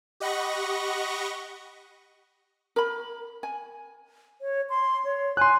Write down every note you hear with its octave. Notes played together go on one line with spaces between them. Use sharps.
G4 D#5 F#5 B5 C#6 A#6
A#4 B5
G#5
C#5
C6
C#5
G#5 C6 F#6